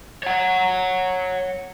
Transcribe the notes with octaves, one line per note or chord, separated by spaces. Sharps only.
C#5 F#5